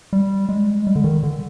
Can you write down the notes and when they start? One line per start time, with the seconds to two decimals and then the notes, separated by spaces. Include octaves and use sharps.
0.13 G3
0.49 G#3
0.87 G3
0.96 D3
1.04 D#3
1.23 D3